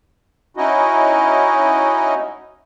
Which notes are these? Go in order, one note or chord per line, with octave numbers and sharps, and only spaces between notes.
C#4 D#4 E4 F#4 D#5